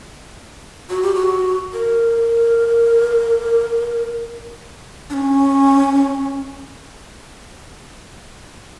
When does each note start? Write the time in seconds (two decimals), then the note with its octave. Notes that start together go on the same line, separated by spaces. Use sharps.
0.90 F#4
1.03 G4
1.16 F#4
1.73 A#4
5.10 D4
5.14 C#4